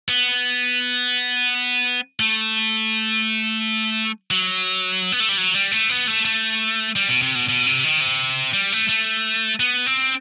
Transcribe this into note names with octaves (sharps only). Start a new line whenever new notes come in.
B3
A3
F#3
B3
A3
G3
F#3
G3
A3
B3
A3
A3
G3
B2
C3
B2
B2
C3
D#3
C3
G3
A3
A3
B3
C4